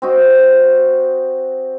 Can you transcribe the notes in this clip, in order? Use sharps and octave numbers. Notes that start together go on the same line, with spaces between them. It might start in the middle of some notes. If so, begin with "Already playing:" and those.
C4 F#4 D#5